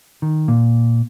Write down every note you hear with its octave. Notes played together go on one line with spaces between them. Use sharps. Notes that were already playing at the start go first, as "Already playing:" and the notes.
D#3
A#2